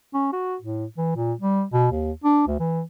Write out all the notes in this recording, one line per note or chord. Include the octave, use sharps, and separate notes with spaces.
C#4
F#4
A2
E3
A#2
G3
B2
D#2
D4
D2
E3